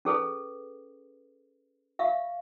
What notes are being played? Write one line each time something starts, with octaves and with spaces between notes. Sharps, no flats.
C#4 G#4 A4 B4
E5 F5 C#6